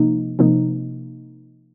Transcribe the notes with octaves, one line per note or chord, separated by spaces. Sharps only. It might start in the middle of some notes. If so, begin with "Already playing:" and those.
Already playing: C3 F3 A#3 D#4
C3 F3 A#3 D#4